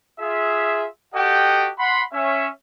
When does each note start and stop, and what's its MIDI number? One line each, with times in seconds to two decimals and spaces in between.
0.20 0.86 65
0.20 0.86 68
0.20 0.86 76
1.15 1.71 66
1.15 1.71 67
1.15 1.71 69
1.15 1.71 75
1.15 1.71 78
1.15 1.71 79
1.79 2.03 78
1.79 2.03 83
1.79 2.03 84
2.13 2.48 61
2.13 2.48 76